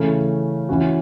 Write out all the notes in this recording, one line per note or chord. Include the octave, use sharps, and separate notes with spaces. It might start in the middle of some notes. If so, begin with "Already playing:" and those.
Already playing: C#3 E3 A3 C#4
E3 C#4 F#4